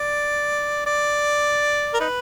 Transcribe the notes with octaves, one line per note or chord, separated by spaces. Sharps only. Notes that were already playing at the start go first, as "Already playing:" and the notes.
Already playing: D5
D5
A#4
D#4 B4